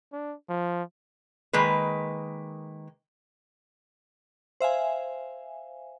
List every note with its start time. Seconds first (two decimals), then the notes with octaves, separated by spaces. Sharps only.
0.13 D4
0.49 F3
1.53 D#3 G#3 A#3 B4
4.60 C5 E5 F5 G#5